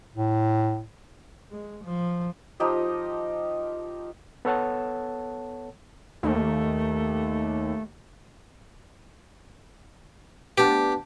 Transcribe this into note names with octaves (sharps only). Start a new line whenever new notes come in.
A2
G#3
F3
F3 D#4 G4 D#5
B3 A4 C#5 F#5 A5
D#2 A3
B3 D4 G4